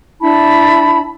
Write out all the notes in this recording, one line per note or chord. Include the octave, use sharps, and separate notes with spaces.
D4 E4 A5 B5